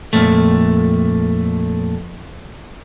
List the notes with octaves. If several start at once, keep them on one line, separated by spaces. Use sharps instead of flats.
F2 A#2 A3